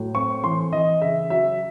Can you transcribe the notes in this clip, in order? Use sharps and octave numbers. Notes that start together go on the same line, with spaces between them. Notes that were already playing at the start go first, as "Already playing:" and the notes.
Already playing: A2 F#3
C4 C#6
E3 C6
E3 D#5
C#3 E5
F#3 E5